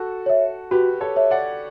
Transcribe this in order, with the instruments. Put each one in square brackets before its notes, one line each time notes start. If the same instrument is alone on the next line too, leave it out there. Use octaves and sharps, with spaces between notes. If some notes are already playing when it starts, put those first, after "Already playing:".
Already playing: [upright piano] F#4 A4
[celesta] C#5 E5
[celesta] F#4 [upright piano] G4 B4
[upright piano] A4 C#5
[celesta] C#5 E5
[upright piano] D5 F#5